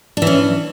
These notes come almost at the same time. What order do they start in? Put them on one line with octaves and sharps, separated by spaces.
D4 E3 C#4